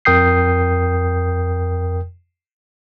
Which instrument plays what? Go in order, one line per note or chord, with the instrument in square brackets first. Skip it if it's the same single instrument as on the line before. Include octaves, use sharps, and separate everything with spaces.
[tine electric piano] F2 A#4 G5 D#6 G6 C7